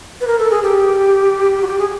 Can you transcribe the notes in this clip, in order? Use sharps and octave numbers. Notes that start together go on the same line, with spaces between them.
B4
A#4
A4
G#4
G4
F#4
G4
G#4